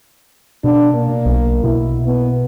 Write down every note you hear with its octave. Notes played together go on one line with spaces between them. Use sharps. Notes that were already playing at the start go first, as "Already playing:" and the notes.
B2 D4
A#3
B1
B2 E4
B3